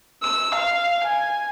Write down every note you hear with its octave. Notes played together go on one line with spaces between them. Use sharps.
E6
F5
G#5